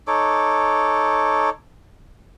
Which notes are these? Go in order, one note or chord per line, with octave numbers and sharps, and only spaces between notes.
D#4 A4 C#5 D6